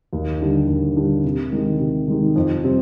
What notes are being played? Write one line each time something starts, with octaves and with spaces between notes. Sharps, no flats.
D#2
D3 G3 D4 G4
D#2
D3 G3 D4 G4
C3
D#3 G#3 D#4 G4
C3
D#3 G#3 D#4 G4
F2
C3 G3 C4